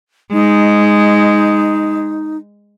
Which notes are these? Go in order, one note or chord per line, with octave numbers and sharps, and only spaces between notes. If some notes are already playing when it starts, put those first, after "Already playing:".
G#3 D#4